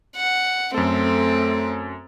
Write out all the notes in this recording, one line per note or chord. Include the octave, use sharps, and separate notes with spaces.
F#5
F#2 A3 C4 A4